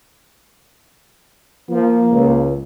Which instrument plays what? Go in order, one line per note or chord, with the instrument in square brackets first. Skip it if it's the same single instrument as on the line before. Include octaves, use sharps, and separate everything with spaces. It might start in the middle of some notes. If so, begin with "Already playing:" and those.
[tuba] F3 [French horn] A#3
[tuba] C#2